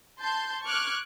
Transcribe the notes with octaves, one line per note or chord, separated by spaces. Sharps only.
A5 C6 G6
C#6 D6 F6 F#6 G#6